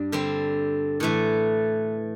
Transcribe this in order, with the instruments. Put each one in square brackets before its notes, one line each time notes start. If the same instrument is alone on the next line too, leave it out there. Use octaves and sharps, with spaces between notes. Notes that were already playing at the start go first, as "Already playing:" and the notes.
Already playing: [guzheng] G2 D4
D3 G3 C4
A2 E3 A3